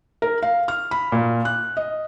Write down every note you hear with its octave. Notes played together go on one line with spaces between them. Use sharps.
A#4
F5
F6
B5
A#2
F#6
D#5